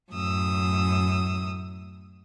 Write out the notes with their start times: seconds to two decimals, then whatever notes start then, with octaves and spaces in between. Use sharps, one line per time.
0.12 F#2 A2 D#6 E6